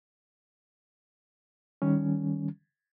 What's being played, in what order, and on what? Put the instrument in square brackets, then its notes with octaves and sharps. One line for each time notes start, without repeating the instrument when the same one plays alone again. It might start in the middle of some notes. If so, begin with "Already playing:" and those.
[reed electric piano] D#3 G3 C#4